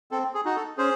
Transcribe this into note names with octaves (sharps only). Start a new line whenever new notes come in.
C4 A4
G#4
D#4 F#4
A4
C#4 G#4 C5